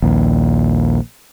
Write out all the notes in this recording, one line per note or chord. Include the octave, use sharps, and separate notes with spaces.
A#1 D#2